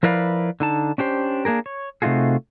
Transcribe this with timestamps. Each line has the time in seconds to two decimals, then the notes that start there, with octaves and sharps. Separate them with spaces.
0.03 F3 E4 A#4 B4 D5 F5
0.60 D3 D#4 A5
0.98 C#4 D4 G4 C5
1.45 A#3 D4 G#4 A#4
1.66 C#5
2.02 C3 A3 D#4 F4 F#4 G#4